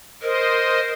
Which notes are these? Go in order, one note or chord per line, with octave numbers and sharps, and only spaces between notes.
A#4 C5 D#5